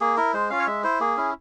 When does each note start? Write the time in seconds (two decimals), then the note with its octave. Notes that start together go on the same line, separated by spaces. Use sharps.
0.01 A#3 G#4
0.17 E4 A#4
0.34 G#3 C5
0.50 C#4 F4 F5
0.59 C#5
0.67 G#3 E5
0.84 E4 C5
1.00 A#3 G#4
1.17 C#4 E4